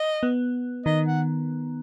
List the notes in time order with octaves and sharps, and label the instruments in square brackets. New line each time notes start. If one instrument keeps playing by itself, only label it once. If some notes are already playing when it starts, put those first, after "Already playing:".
Already playing: [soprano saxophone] D#5
[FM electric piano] B3
[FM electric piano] D#3 [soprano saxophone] D#5
[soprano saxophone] F#5